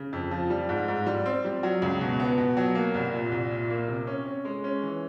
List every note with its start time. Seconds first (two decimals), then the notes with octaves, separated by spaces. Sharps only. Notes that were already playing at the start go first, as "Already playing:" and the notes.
Already playing: C#3
0.13 F2
0.31 F3
0.50 G3
0.69 G#2
0.88 G#2
1.06 G3
1.26 C4
1.44 G3
1.63 F#3
1.82 C#2
2.01 B2
2.20 B3
2.38 B2
2.57 F#3
2.75 A#3
2.94 C2
3.13 A#2
3.31 C2
3.51 A#2
3.70 A#3
3.88 C3
4.07 C#4
4.25 C#4
4.45 G#3
4.64 C#4
4.83 E3